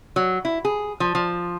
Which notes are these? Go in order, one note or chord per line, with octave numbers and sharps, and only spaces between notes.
F#3
E4
G#4
F3
F3